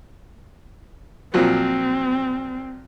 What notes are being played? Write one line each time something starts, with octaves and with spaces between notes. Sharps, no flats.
A#2 F3 F#3 C4